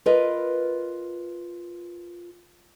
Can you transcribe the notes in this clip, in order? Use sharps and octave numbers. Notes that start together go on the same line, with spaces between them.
F4 A#4 B4 D#5